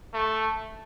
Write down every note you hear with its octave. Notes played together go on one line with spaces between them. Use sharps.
A3